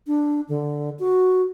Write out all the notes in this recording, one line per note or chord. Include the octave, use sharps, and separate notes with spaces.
D4
D3
F#4